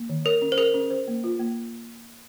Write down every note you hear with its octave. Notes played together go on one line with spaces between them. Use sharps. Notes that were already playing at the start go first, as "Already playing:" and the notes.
Already playing: A#3
D#3
A#4 C#5
C#4
C5
G#4 A#4
C#4
C5
A#3
F4
A#3